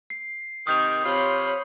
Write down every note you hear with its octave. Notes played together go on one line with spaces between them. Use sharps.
C7
C3 D#3 D#6 G6 F7
C3 F4 C#5 B5